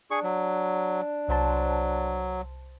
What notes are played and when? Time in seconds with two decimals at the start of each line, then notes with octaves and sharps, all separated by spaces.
0.11 D4 G#4 C#6
0.23 F#3
1.28 C2 F#3 C5 A5